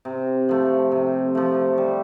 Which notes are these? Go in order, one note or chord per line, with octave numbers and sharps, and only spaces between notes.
C3
F3 A3
C3
F3 A3
G3